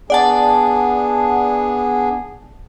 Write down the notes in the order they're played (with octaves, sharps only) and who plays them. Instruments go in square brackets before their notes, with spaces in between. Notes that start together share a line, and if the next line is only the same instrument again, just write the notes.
[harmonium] B3 D4 G#4 [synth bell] D5 F#5 A5